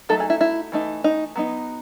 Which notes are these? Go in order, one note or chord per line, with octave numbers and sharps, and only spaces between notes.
F#3 A3 D#4 A4
G#4
E4
E4
E3 A3 D#4
D#4
F#3 B3 D#4